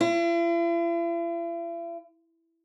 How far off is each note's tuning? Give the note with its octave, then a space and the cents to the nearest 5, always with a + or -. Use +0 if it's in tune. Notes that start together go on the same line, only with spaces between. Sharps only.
E4 +45